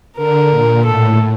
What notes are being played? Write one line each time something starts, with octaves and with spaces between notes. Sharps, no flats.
D3 A#4
A#2
A2 A4